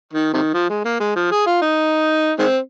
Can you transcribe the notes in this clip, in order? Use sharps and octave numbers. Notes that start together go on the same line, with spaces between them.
D#3
C3 D#3
F3
G#3
A#3
G#3
F3
G#4
F4
D#4
D#3 G#3 C4